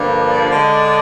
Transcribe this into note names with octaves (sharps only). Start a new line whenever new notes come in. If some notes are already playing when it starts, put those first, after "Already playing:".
Already playing: G2 D3 F3 A#3
D5
D3 G#3